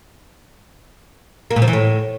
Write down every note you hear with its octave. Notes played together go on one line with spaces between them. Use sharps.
A#3
A#2
F3
E3
A2